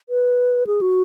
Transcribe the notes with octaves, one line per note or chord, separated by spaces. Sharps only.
B4
G#4
F#4